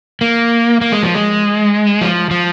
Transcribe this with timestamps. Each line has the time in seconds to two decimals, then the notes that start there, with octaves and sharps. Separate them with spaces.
0.21 A#3
0.81 A#3
0.92 G#3
1.03 F3
1.14 G#3
2.01 F3
2.31 F3